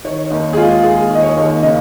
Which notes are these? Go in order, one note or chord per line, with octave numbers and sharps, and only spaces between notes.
D#3 C#5
D#2 D#4
G#4
G#3 F4
D#2 G#4
D#3
D#5
C#5
D#2
C#3 D#5